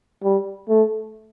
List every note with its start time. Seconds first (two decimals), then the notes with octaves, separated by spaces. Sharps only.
0.23 G3
0.69 A3